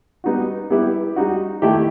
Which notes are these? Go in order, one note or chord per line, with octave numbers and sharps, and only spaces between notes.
G3 B3 D#4 F#4
G3 B3 E4 G4
G3 D#4 F#4
D#3 A3 E4 G4